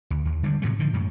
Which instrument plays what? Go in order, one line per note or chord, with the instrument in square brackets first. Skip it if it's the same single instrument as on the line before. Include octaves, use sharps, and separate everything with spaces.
[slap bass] D2
D#2
D3 G3 G#3
A2 C3 F#3 A3
D3 D#3 F3
F#2 A2